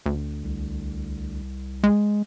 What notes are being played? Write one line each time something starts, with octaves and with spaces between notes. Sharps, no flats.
D2
C2
G#3